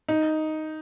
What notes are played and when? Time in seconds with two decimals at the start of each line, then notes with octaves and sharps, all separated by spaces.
0.09 D#4